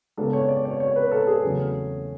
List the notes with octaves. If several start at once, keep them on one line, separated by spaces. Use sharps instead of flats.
C#3 G#3 B3 D4 A4
C#5
D5
C#5
C#5
B4
A4
G#4
E2 C#3 F#3 A3 C#4